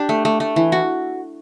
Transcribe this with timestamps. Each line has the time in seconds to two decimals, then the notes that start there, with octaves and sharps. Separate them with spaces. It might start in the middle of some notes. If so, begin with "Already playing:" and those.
Already playing: D4 G4
0.09 A3
0.25 A3
0.40 A3
0.56 E3
0.72 F#4